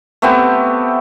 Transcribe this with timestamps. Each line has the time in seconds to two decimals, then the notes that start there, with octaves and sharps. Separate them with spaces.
0.22 A3 B3 C4 G4